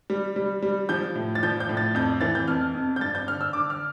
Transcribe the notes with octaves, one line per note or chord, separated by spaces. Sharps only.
G3
G3
G3
F3 G6
A2
A6
F3 G6
G6
A2
A6
F2 G6
E3 A6
G6
F2 F6
F2
G6
G2 A6
G6
D3 F6
E6
D3 D6
F6